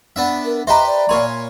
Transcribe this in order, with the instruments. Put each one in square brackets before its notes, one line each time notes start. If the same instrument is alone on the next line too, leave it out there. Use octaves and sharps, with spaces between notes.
[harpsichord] B3 D4 E5
[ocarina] A#4
[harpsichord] G4 B4 C5 [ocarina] D#5 [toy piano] E5 A#5
[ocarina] D5
[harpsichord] A#2 C#5 G#5 [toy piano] A#4 B5 C6